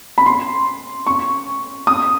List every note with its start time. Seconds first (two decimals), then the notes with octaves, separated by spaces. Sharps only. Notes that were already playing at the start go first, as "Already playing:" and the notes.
0.18 B5
0.26 C6
1.07 C#6
1.87 D#6